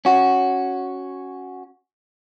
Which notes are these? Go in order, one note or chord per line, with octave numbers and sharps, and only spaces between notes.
C#4 F#4